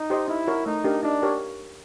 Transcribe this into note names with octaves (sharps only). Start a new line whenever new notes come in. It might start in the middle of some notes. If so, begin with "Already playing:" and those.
Already playing: D#4
G4 C5 D#5
D#4 E4
F#4 A#4 C#5
A3 D#4
D4 G4 A#4
D4 D#4
G4 A#4 C#5